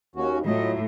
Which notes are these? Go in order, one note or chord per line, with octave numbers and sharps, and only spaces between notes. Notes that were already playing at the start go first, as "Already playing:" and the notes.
D#2 C#4 F#4
A2 F#3 E4 F4 D#5